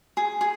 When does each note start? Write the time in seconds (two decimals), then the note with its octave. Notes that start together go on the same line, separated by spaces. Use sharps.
0.17 G#4
0.41 G#4